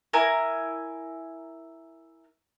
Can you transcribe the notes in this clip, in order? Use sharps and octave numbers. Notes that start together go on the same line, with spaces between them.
E4 A#4 G#5 D6